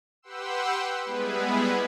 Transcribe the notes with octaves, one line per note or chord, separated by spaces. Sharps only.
G4 B4 F#5 G5 C6 E6
G3 G#3 B3 E4 G#4 B4